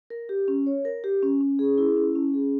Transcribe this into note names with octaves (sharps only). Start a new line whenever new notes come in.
A#4
G4
C#4
C#5
A#4
G4
C#4
C#4
G#4
E4
C#4
C#4
G#4